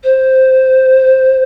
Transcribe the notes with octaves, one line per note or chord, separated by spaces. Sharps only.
C5